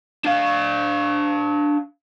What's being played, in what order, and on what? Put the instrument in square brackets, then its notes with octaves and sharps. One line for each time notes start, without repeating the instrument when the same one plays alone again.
[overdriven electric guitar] D4 F5